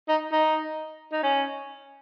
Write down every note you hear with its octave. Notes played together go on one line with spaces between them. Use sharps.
D#4
D#4
D#4
C#4